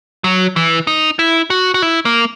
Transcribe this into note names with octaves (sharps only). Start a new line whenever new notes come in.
F#3
E3
D#4
E4
F#4
F#4
E4
A#3